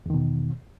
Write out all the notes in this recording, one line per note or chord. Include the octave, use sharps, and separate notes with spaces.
E2 B2 D#3